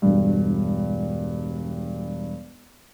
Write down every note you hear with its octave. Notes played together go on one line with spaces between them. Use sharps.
E1 G2